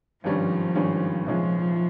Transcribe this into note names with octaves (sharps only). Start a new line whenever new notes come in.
G#1 G2 F3 G3 C#4
G#1 G2 G3 C#4
C2 A#2 F3 G#3 C#4 F4